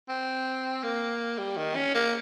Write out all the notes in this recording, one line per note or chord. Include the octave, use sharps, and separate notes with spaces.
C4
A#3
G3
D#3
C#4
A#3